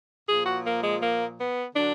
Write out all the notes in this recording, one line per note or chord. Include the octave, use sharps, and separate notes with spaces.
A#2 F3 G#4
F#4
A#3
G#3
A#3
B3
D3 F#3 D4